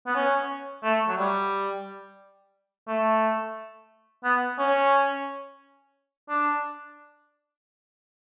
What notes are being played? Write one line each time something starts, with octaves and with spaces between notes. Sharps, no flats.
B3
C#4
A3
F#3
G3
A3
B3
C#4
D4